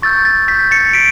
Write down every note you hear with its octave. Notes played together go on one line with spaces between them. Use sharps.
C#6 E6 G6 A6
A6
G6 B6
A6 C#7
B6 D7